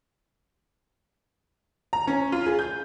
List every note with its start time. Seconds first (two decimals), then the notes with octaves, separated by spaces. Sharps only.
1.93 A#5
2.07 C#4
2.32 F4
2.46 G#4
2.59 G6